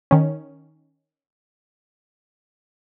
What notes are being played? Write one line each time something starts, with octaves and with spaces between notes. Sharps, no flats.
D#3 C#4